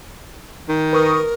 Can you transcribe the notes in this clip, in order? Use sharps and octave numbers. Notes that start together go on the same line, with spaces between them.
D#3
A#4 B4 C#6 D#6